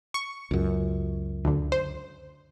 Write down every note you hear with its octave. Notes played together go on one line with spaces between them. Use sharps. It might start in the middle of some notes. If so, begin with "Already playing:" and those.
C#6
C#2 F#2
D2 D3
C5